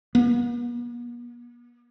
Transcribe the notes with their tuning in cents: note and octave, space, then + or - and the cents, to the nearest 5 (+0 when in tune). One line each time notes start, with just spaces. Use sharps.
B3 -45